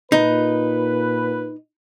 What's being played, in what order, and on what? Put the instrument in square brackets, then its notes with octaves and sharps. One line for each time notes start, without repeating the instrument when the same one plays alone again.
[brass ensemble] A#2 B4 [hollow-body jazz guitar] D#4